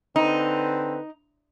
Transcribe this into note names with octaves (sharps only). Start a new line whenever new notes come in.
D3 C4 D#4 B4